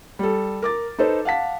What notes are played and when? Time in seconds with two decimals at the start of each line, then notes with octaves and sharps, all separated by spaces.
0.19 G3 A4
0.62 A#4 D6 A6
0.99 D#4 A4 B4 C5
1.25 F5 F#5 A5 B6